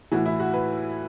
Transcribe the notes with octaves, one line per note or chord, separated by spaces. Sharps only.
A2 E3 F#4
E4
F#4
B4